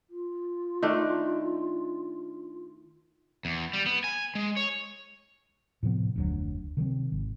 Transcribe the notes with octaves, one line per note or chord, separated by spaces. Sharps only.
F4
D#3 A3 D4
E2
G3
B3
G#5
G#3
C#5
A2 C3 F3 B3
F1 D2 F#3
C3 D#3 F#3 C4
G#1